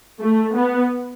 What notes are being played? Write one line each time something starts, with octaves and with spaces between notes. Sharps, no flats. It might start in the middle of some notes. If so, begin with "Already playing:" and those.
A3
B3